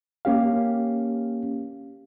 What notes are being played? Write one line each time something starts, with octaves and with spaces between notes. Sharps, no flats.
A#3 C#4 G4 F5